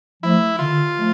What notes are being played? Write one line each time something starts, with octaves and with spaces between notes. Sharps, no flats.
F3 A3 E4
D3 F4
F3 A3